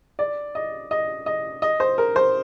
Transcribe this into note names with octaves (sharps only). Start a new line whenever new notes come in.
D5
D#5
D#5
D#5
D#5
C5
A#4
C5